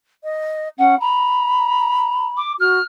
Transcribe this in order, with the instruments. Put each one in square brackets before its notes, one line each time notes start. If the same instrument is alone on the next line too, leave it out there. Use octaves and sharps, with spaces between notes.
[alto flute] D#5
[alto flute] C#4 [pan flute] F#5
[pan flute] A#5 [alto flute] B5
[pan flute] D6
[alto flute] F#4 [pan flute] F6